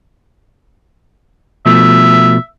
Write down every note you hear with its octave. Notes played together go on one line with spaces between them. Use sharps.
B2 F3 A3 E5